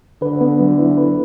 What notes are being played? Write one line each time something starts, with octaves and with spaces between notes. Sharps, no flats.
D3 B4
B3
F#3
E4
B4